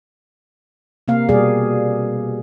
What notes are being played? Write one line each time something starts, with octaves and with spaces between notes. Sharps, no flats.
C3 A#3 F5
B2 G3 A#3 G#4 D5